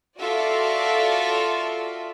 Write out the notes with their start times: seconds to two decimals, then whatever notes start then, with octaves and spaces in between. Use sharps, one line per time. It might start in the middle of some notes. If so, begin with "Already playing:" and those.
0.19 F4 F#4 A4 D5 E5 F5